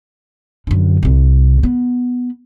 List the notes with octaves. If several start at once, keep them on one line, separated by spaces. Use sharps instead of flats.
F#2 D3
C2 C3
B3